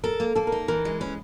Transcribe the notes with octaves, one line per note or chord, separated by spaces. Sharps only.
A4 A#4
A#3
A#3 A4
A#4
D#4
E3 A#4
G#3
C#4 B4